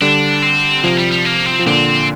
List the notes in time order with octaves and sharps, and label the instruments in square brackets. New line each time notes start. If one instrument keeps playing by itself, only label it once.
[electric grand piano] D3 G3 [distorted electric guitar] D4
[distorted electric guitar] C4
[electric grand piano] C3 F3 [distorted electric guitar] A#3
[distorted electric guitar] G3
G3
A#3
C4
[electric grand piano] F3
[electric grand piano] A#2 D3 [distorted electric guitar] C4